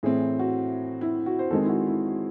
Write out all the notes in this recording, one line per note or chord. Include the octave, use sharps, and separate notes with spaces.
A2 E3 C4 G#4
F#4
E4
F#4
C5
D#3 G#3 C4 A4
E4
F#4
E4
F#4